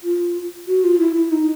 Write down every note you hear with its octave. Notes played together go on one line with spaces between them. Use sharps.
F4
F#4
F4
E4
E4
D#4